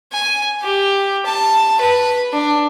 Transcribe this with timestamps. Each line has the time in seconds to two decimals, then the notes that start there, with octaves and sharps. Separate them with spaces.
0.13 G#5
0.62 G4
1.25 A5
1.81 B4
2.33 D4